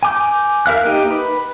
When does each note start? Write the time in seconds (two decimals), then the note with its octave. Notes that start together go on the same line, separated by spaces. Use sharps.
0.03 G#5 D6 G6
0.66 A#4 E5 F5 F#6
0.85 A#3 D#4 G4
1.10 B4